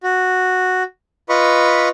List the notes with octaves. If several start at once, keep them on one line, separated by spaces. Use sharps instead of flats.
F#4
F4 B4 D#5 B5 C#6